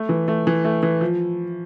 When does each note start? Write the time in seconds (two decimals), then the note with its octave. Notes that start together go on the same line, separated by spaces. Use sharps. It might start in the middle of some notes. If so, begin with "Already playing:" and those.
Already playing: A3
0.09 E3
0.28 A3
0.47 E3
0.64 A3
0.83 E3
1.01 F3